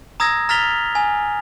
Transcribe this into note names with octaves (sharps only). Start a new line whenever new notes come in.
A#5 D#6 E6 G#6 A#6
A#5 F6 A6 B6 F7 G7
G#5